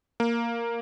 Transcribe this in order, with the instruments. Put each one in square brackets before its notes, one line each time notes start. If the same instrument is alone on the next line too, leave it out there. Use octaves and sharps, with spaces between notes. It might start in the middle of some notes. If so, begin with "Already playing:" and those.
[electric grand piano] A#3